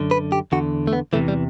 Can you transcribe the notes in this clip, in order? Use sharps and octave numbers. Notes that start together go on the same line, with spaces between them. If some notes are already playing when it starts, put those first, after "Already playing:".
Already playing: F#2 D3
B4
G4
E2 D3 F#4
A3
B3
E2 C3 E3 A3
G3